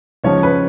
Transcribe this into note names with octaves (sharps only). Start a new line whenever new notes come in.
C#2 C#3 F3 C#5
B4